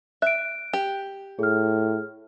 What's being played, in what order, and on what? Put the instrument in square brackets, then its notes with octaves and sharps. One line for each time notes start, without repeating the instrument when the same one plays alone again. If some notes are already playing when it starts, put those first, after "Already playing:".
[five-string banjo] E5 [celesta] F#6 D7
[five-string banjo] G4
[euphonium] A2 [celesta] G#4 F6